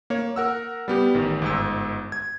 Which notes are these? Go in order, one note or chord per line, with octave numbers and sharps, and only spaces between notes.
A#3 C#5
A#4 F#5 E6
G3 B3 G4
A1 D#3
G1 G#2 E6
G#6